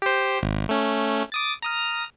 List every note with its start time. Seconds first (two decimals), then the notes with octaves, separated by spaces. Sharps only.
0.02 G4 C5
0.43 G#1
0.69 A3 C#4
1.32 D6 D#6 A6
1.62 A#5 D#6 F6